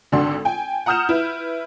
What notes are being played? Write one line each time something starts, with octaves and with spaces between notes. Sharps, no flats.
G#1 D3 D4 F#4 A4 C6
G5 G#5
F#5 A#5 D#6 F6 G6 E7
E4 B4